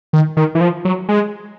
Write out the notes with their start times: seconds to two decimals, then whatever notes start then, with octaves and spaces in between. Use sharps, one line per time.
0.13 D#3
0.37 D#3
0.55 E3
0.61 F3
0.85 F#3
1.09 G#3